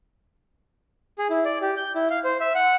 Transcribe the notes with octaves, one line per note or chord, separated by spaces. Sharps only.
G#4
E4
D5
G4
G6
E4
F5
C5
E5
F#5